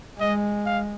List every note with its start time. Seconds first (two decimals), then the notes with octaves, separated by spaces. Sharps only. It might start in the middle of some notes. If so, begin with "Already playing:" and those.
0.20 G#3 D#5
0.65 F5